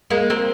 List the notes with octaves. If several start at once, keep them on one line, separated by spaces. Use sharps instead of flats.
G#3 A#3
A#3 C4